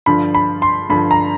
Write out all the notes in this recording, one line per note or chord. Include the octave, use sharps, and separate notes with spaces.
G2 D3 F3 B5
B5
C6
G2 D3 F3 B5
A#5